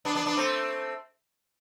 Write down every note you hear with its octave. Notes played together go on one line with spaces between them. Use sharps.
B3 D4
B3 D4
B3 D4
A3 C4